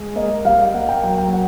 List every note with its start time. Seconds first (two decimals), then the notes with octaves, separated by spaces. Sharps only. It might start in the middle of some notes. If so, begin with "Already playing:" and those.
Already playing: G#3
0.16 A#3 D#5
0.45 G3 F5
0.74 A#3 F#5
0.89 G5
1.03 F#3 G5
1.18 G5
1.33 F#5